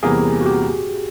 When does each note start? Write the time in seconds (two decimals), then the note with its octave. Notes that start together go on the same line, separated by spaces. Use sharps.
0.03 E2 C3 E3 G3 A#3 G#4
0.41 F#4
0.46 G4